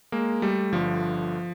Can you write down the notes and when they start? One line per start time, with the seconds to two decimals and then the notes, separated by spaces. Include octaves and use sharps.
0.12 G#3 A#3
0.42 G3 A3
0.72 G1 G2 D3 F3